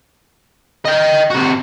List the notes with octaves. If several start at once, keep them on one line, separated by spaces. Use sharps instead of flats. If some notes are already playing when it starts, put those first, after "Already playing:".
D#5 G5
C3 F#4